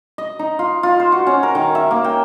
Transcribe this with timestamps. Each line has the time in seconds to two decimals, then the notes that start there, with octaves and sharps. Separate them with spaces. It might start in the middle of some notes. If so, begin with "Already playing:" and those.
0.18 D#5
0.39 D#4
0.59 F4
0.83 F4
1.00 C5
1.12 F#4
1.27 C#4
1.43 A#4
1.55 D#3
1.75 E5
1.91 A#3
2.04 G5